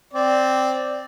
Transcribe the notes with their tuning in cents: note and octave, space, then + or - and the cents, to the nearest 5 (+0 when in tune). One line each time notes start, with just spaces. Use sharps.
C4 -5 D5 +0